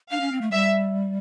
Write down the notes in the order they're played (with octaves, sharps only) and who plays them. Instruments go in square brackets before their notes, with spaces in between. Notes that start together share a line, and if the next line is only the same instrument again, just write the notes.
[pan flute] D4 [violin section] F5
[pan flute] C#4
C4
A3
[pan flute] G3 [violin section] E5